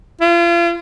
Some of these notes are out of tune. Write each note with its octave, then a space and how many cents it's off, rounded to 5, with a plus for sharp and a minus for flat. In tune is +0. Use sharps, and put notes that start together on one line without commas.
F4 -35